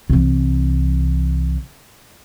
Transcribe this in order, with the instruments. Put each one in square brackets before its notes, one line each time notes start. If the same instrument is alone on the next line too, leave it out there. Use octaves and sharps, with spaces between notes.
[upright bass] C2 E3